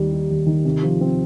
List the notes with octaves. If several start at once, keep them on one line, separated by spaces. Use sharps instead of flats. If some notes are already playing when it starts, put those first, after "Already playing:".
Already playing: D#2 D#3 G3
D#4
D#2
D#3
C3
F3
C4